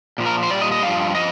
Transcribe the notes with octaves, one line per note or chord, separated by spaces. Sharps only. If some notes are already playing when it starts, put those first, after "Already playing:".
A#2 F3
A#4
C5
A#2 G3 D5
D#5
D#5
G2 F3 F5
F3 D#5